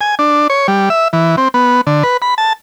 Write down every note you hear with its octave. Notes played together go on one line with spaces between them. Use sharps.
G#5
D4
C#5
G3
E5
E3
C4
B3
D3
B4
B5
A5